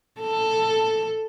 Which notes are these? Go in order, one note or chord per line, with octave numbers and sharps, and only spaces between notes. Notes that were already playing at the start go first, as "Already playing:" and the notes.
A4